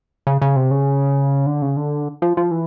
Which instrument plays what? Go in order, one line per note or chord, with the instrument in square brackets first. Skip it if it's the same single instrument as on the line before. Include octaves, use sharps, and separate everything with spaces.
[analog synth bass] C#3
C#3
C3
C#3
D3
C#3
D3
F3
F3
E3